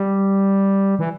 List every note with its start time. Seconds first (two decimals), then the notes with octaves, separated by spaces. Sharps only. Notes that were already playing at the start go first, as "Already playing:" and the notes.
Already playing: G3
0.99 E3